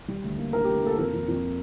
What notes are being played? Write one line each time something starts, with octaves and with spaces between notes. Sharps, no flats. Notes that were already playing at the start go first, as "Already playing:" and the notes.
G3
D2
A#3
D3 A#4
G4
D2
A#3 A4
F2 A#4
F2
F2